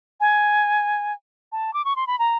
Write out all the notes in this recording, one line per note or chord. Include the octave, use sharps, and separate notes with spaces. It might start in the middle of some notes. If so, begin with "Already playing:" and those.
G#5
A5
D6
C#6
C6
B5
A#5